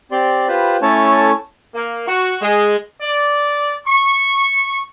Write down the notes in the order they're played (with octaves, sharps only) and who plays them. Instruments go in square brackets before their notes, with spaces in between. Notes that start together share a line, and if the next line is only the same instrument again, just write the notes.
[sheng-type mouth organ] C4 G4 D5 C6
F4 G4 B4 C5 B5
A3 C#4 E4 A4 C#5 A5
[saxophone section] A#3
F#4
G#3
[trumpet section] D5
C#6